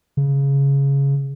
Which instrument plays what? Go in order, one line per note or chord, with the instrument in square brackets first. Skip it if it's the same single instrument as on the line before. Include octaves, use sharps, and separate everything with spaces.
[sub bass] C#3